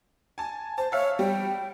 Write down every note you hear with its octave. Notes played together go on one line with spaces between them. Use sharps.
G#5 A5
C5 A5
C#5 E5 F5
G3 G5